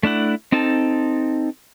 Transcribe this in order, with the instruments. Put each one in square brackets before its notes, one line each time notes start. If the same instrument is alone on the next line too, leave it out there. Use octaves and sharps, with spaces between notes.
[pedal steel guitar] A3 D4 E4 F#5
C4 D#4 A4 A5